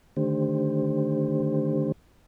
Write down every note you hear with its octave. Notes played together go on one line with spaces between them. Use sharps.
D3 D#3 A3 D4 G4 C5